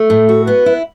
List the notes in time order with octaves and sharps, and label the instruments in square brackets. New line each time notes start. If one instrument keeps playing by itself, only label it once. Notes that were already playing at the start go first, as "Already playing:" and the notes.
Already playing: [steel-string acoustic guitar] A3 [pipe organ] A4
[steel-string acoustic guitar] A2
F#4
[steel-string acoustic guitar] B3 [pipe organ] B4
[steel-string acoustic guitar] E4